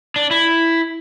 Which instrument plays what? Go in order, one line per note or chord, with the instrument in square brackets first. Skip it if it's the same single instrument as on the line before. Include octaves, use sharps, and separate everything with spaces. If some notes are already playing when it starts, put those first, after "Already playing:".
[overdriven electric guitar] D4
E4